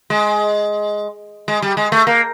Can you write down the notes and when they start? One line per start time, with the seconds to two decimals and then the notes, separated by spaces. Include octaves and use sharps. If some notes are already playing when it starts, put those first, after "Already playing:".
0.10 G#3
1.48 G#3
1.62 G3
1.77 G#3
1.92 A3
2.07 A#3